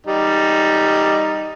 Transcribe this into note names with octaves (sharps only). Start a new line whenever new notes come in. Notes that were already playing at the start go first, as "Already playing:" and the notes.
G3 D#4